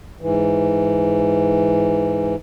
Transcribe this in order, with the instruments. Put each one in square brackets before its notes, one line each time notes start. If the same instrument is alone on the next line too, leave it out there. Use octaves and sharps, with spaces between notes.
[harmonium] G#2 E3